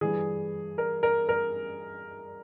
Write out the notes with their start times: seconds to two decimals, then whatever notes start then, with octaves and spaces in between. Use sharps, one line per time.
0.01 G2 E3 G#4
0.78 A#4
1.03 A#4
1.29 A#4